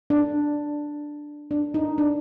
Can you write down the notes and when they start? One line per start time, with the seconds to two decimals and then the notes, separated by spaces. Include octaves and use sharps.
0.10 D4
1.51 D4
1.74 D#4
1.98 D4